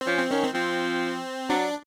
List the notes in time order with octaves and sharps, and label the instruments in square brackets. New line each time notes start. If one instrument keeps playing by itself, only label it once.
[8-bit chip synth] C4
[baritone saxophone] F3 [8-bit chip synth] C#4
[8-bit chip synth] C4
[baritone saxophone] D#3 [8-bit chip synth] C#4
[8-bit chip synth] C4
[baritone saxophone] F3 [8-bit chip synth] C4
[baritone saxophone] F#3 [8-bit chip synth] D4